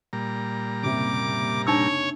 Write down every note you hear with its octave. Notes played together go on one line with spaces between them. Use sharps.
A#2 G3 A#5
F#1 C3 D6
D4 D#4 C#5 E6